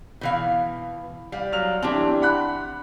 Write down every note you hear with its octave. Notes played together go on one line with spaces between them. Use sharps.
B2 E3 F5
G3 F5
F#3 F6 F7
E3 C4 D4 G4 A5
F#5 B5 F#6